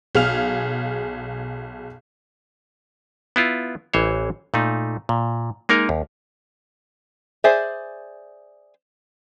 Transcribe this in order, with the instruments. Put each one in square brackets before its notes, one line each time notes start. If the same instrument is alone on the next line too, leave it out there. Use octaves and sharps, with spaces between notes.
[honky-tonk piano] B1 G#4 F5 F6 F7
[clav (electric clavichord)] B3 E4 F4
A1 E3 C5 C#5
A#2 A3 D#4
A#2
G#3 A#3 D#4 A#4
D#2
[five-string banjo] G#4 C5 D5 E5